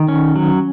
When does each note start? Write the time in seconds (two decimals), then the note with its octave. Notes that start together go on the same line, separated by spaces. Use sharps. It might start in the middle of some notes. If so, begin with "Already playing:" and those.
Already playing: D#3
0.08 C#4
0.36 F#3